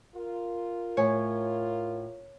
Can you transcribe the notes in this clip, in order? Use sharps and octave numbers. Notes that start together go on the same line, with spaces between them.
F4 A#4
A2 C#5 G#5